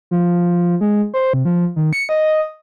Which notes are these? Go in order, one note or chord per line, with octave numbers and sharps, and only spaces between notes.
F3
G#3
C5
C3
F3
D#3
C#7
D#5